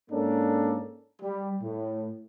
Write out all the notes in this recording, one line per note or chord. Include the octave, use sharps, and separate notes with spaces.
G#2 A#3 C#4 D4 A4 A#4
G3
A2